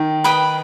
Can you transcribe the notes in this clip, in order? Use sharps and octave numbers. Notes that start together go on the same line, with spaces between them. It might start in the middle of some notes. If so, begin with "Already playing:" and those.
Already playing: D#3
B4 G5 B5 D#6